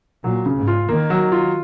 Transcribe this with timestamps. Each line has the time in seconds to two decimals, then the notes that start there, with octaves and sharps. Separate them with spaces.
0.24 A#2 F#3
0.46 C#3
0.57 G#2
0.68 F4
0.89 D#3 A#3
1.10 F#3
1.32 F4